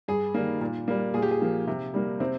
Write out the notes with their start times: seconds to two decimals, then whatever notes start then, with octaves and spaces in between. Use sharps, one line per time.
0.08 G2 G#4
0.34 D#3 G3 A#3
0.61 A#2
0.88 G3 A#3
1.14 A#2 G#4
1.22 G4
1.31 G#4
1.41 F3 A#3
1.67 C3
1.94 G3 A#3
2.20 C3 C4